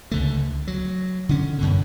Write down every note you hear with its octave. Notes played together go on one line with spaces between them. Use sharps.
C#2 D3 A3
F#3
D3 C#4
F#2 B2 D3